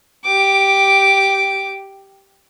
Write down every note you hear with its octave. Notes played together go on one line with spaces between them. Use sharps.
G4 D6